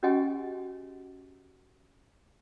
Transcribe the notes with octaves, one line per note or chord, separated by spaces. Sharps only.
C#4 F#4 G4 D#5 F#5 G#5